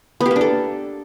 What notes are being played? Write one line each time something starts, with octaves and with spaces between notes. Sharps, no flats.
B3
G4
A#3
D4
A4